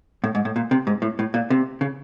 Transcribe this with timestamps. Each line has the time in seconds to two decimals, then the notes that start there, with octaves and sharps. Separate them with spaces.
0.24 A2
0.35 G#2
0.45 A2
0.56 A#2
0.71 C3
0.87 G#2
1.02 A2
1.19 A2
1.34 A#2
1.50 C3
1.81 C#3